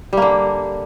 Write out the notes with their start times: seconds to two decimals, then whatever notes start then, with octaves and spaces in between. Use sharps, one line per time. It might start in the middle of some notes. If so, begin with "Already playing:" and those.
0.13 G3
0.17 A#3
0.22 D3